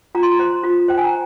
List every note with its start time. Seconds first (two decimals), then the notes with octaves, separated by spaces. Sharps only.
0.15 F4 A#5
0.23 C6
0.32 A#5
0.39 C5
0.64 F4
0.88 C5 G5
0.98 G#5
1.04 A#5